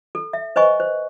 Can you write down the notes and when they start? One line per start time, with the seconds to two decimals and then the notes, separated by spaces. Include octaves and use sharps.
0.15 A4
0.33 E5
0.56 B4 C5 D#5 G#5 C#6
0.80 C5